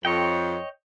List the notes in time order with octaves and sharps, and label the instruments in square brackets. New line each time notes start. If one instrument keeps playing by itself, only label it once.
[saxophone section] F2 [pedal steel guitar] C#5 D#5 G5